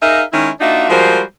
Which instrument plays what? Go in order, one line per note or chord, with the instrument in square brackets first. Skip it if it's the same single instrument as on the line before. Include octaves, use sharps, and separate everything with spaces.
[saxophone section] D#4 G#4 A#4 E5 F5
D#3 G#3 C#4 E4
A#3 D4 D#4 F4 F#4 E5
F3 G3 G#3 F#4 A#4 C5